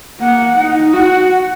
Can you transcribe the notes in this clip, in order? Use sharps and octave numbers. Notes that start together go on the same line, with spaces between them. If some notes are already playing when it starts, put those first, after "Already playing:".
A#3 F#5
D#4
F#4 F#5